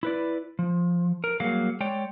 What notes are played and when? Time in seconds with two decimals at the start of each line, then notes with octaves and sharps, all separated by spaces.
0.03 E4 B4 D5
0.59 F3
1.24 A#4
1.40 F#3 G3 A#3 F#4 G#4 F5
1.80 G#3 C#5 D5 G5